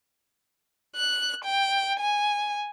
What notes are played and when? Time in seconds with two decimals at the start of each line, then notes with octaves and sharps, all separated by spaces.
0.96 F#6
1.44 G5
2.00 G#5